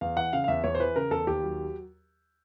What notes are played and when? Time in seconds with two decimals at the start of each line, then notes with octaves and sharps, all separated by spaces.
0.01 E2 F5
0.17 E3 F#5
0.33 C#3 F5
0.44 F5
0.48 E2 E5
0.64 E2 C#5
0.75 C5
0.80 E3 B4
0.96 C#3 A#4
1.11 E2 A4
1.27 D#2 G4
1.43 F#3